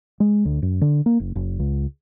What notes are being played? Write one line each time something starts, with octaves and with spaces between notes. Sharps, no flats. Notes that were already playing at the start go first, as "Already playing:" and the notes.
G#3
D2
F#2
D3
A#3
F#1
F#1
C#2